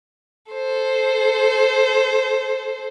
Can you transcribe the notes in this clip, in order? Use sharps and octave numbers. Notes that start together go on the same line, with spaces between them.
A4 C5